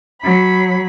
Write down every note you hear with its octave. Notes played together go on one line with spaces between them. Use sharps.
F#3 B5